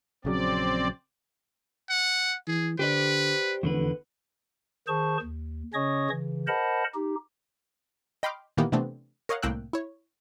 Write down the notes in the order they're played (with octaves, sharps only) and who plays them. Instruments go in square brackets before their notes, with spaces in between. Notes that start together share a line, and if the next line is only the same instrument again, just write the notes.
[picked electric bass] A#1 C#3 F#3 [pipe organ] C4 D5
[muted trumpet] F#5
[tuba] E3 [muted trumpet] G#4
[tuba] D3 [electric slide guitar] G4 C5 D5 [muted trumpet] B4
[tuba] F1 [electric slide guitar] E2 D3 B4
[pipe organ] D#3 G#4 C5 A5 C#6
D#2
C#3 C#4 C#5 D#5 C#6 D#6
C#3 E3
A#4 C5 D#5 F#5 A5 B5
D#4 G4
[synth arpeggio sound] D#5 G5 B5 C6 D6 F6
A#2 D#3 E3 A#3 B3 G4
C3 E3 A3 B3 C4 D4
A#4 C#5 D#5 F5 F#5
C2 A2 A#3 G5 E6 F#6
E4 C#5